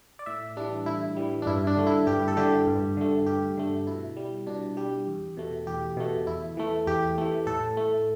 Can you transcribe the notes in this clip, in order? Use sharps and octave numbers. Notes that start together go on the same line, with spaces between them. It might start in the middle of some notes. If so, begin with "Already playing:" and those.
D5
A2 E5
E3 G3 D4
A2 E4
E3 G3
D4
G2 E4
D4
D3 A3
E4
G2 G4
A4
D3 A3 G4
G2
D3 A3
G2 G4
D3 A3
B2 E4
G3
B2 D4
G3 G4
E2
B2 A3
E2 G4
B2 A3
E2 E4
E3 A3
E2 G4
E3 A3
A2 A4
A3